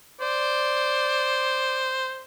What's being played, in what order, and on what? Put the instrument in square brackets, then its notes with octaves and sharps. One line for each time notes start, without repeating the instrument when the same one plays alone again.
[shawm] C5 [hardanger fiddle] D5